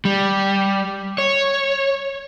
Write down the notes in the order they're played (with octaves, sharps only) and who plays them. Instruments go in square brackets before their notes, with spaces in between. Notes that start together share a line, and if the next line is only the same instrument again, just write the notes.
[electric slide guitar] G3
C#5